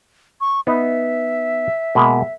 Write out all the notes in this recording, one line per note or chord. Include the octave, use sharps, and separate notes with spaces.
C#6
B3 D#4 E5
B2 G#3 A#3